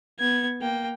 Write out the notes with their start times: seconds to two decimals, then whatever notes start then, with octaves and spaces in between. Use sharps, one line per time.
0.19 B3 G#6
0.61 A#3 G5